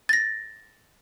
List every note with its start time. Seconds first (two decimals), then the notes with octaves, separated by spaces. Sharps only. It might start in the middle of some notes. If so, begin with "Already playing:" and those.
0.09 A6 A#6